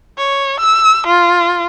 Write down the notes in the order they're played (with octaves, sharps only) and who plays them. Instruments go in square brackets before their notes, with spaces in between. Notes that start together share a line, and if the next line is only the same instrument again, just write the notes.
[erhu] C#5
E6
F4